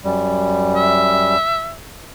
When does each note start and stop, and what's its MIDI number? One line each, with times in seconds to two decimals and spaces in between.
0.05 1.36 42
0.05 1.36 55
0.76 1.73 76